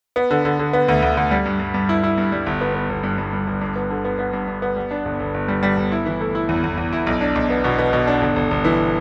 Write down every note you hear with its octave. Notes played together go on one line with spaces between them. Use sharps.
B3
D3
D3
D3
B3
D2
D2
D2
G3
G2
G2
G2
E4
E4
G2
G3
G1
B3
B3
G1
G2
G2
G2
G1
G2
B3
D3
B3
B3
G2
G2
B3
G3
D4
G1
G1
G1
G3
G3
G1
E4
E3
A3
E4
E2
E2
E2
E4
B1
D4
B1
B3
B2
B3
B2
D4
G1
G1
G1
E3